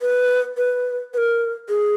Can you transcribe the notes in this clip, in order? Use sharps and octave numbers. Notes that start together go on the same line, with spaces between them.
B4
B4
B4
A#4
G#4